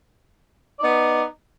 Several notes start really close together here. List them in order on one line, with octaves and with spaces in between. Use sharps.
D5 D#4 B3